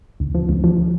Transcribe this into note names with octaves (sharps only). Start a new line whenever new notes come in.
D2
F3
D2
F3